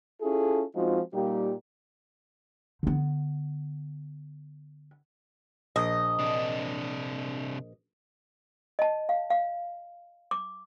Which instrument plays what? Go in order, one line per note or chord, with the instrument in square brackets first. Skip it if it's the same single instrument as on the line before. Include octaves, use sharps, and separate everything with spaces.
[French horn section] C#4 E4 F4 G#4 A4
F3 G#3 C4 D#4 F4 F#4
A#2 G3 A#3 D#4 G4
[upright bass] D3 B3
[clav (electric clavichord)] A#1 [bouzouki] D#5
[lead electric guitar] C3 D4
[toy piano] D#5 A5
F5
F5
D6